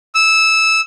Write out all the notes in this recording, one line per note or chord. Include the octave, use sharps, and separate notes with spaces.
E6